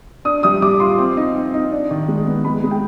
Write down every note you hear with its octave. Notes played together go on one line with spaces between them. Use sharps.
D4 D#6
G3 D#6
G3 D6
F4 C6
C4
D#4
C4
D#4
D4
D#3
G#3
B3
G#3 B5
G#3
G5